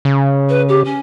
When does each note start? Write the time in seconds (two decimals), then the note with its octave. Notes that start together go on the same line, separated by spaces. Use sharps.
0.05 C#3
0.49 B4
0.69 G4
0.85 C#4